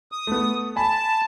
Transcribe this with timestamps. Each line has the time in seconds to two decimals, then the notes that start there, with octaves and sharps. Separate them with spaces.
0.12 D#6
0.27 A3 B3
0.76 G#5 A5 B5